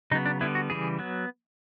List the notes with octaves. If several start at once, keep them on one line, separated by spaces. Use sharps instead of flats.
C#3 F#3 B3 D#4
D4
D3 G3 B3 E4
F#4
C#3 E3 G3 G#4
F#3 B3